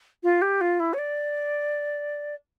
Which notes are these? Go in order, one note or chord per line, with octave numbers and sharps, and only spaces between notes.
F4
G4
F4
E4
C#5
D5